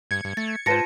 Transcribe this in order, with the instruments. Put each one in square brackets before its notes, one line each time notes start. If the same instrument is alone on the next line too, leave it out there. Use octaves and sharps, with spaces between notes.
[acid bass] G2 [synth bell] G#6 C#7
[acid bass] G2
[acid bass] A3 [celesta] A6
[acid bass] G#2 [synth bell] F4 B4 C5 [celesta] A5 A#6 C#7